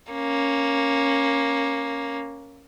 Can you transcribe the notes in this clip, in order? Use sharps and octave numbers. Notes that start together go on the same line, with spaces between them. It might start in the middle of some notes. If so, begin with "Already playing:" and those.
A#3 C#4